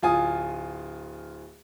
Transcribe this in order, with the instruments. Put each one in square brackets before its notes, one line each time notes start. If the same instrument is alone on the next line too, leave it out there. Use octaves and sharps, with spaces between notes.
[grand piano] D1 F4 G#5 D#6